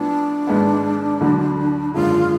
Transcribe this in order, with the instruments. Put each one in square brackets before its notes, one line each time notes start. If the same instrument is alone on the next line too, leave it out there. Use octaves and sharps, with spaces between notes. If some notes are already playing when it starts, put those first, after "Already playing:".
Already playing: [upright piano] A2 F3 B3 [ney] D4
[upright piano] G#1 G#2 G#3 B3
D2 D3 F#3
[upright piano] G#1 F#2 D3 G#3 [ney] F4